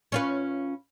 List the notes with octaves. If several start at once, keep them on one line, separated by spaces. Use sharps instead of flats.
C#4 F4 B4